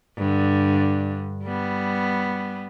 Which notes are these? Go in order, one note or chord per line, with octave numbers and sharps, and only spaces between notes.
G2 D3
G3 B3